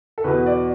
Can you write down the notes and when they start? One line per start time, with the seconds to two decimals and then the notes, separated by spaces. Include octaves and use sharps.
0.18 A4
0.24 E2 B2 B4
0.46 D5